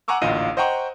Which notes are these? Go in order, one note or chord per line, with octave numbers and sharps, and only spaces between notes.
F#5 G#5 A#5 C#6 D6 E6
A1 D2 A#2 D#5 F5 D#7
C5 D#5 F#5 G5 A#5 C#6